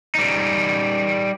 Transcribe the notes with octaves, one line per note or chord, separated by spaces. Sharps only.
G3 D#4